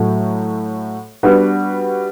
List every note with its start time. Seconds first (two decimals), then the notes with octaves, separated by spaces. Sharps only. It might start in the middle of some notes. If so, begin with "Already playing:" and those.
Already playing: A2 F#3 A3
1.23 G3 B3 D4 F#4 B4